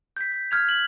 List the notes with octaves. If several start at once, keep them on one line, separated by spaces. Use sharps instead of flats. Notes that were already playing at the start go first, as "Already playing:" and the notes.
G6 B6
G6
F6 G#6 F7
F#7